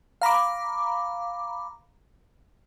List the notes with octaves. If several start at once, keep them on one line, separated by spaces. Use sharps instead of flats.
F5 A#5 B5 D6